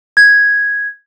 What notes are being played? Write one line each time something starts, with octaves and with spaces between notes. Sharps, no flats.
G#6